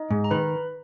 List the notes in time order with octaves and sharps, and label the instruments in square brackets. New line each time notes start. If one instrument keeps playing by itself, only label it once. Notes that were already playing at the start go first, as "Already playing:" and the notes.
Already playing: [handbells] D#4 D#5
[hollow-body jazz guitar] G#2
[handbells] A#5
[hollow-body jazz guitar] D#3 [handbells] B4 B5